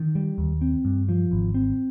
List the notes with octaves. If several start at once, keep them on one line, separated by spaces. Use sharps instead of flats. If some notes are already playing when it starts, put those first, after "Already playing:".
Already playing: D#3
G3
D#2
C4
G2
F3
G#1
C4